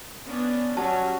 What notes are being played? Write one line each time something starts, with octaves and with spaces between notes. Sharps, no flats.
B3 C#4 D4
F#3 G3 C#4 F#4 A5